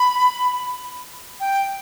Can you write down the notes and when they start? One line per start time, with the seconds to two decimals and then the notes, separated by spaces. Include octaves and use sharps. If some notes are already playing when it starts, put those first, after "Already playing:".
Already playing: B5
1.40 G5